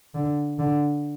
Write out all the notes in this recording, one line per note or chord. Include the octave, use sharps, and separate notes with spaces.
D3
D3